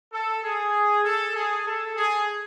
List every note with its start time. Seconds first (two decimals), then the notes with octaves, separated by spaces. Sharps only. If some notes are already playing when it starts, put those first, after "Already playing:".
0.12 A4
0.43 G#4
1.05 A4
1.35 G#4
1.65 A4
1.97 G#4